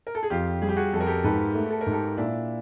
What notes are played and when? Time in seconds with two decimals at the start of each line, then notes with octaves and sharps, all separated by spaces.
0.07 A#4
0.15 A4
0.23 G#4
0.30 F2 F4 G4
0.62 G3 G#4
0.69 G4
0.77 F#4 G#4
0.93 F2 A4
1.01 A#4
1.07 G4 A4
1.24 G#2 A4 B4
1.55 A3
1.71 A4
1.81 A#4
1.86 G#2
1.92 G4 A4
2.17 A#2 D4 E4